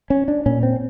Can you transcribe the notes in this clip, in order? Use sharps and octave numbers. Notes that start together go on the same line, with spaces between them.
C#4
D4
A#2 C#4
C4